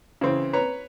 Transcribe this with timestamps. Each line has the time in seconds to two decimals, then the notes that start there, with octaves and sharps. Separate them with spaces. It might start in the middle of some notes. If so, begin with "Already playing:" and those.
0.21 C#3 E3 C4
0.53 B4 C#5 A#5